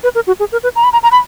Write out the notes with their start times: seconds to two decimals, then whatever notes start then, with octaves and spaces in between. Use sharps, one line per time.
0.04 B4
0.15 A#4
0.27 F#4
0.40 G#4
0.52 A#4
0.63 B4
0.76 A#5
0.84 B5
0.93 A#5
1.03 A#5
1.12 B5